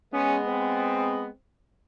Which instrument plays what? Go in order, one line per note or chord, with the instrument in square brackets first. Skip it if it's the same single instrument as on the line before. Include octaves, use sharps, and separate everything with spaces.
[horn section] G#3 B3 [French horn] C#4
[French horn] C4